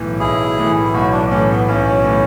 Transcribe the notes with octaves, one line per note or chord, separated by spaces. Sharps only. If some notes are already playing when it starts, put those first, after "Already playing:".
Already playing: B1 A2 E3
B1 E4 G#4
A2 E3
E4
B1 F#4
D4
A2 E3 C#4
B3
B1 C#4
A2 E3